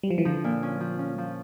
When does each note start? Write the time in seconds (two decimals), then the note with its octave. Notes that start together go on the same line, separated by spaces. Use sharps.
0.03 G3
0.11 F3
0.18 E3
0.25 D3 F3
0.44 A#2
0.63 C#4
0.80 F3
0.99 C#4
1.18 F3